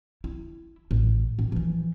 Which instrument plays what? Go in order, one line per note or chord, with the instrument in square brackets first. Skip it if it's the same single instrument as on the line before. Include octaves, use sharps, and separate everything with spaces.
[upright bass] E4
A1 A2
A#2 D#3
E3 F3